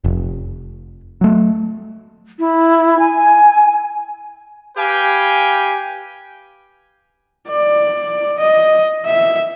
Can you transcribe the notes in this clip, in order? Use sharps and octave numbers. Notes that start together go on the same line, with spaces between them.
F1
F#3 A3
E4
G#5
G4 B4 F5 G5 G#5
D5
D#5
E5